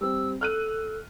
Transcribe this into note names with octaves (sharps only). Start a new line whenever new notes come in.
G3 C4 E6
A4 F6 F#6 D#7